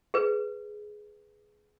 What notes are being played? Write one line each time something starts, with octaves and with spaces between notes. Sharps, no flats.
G#4 B4